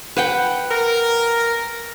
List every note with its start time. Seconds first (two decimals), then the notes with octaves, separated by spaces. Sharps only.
0.17 B4 F#5 G5
0.70 A#4